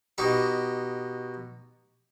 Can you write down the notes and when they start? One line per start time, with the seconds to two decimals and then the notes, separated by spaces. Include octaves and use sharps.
0.18 B2 D#4 G4